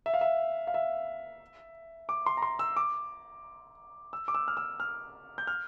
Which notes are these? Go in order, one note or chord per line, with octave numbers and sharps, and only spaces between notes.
E5
F5
E5
F5
E5
D6
C6
A#5
C6
E6
D6
E6
D6
E6
F6
E6
F6
G6
F6